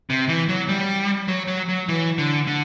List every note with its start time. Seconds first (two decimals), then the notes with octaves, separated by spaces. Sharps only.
0.10 C3
0.29 E3
0.49 F#3
0.69 G3
1.28 F#3
1.48 F#3
1.69 F#3
1.88 E3
2.18 D3
2.47 D3